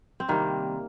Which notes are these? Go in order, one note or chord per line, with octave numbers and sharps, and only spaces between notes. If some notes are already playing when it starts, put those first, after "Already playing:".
C4
C3 D#3 G3 A#3